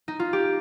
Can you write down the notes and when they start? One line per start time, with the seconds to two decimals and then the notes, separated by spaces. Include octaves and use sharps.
0.08 D#4
0.19 F4
0.33 G4